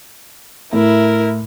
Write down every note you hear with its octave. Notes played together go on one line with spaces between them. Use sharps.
A2 E4 A#4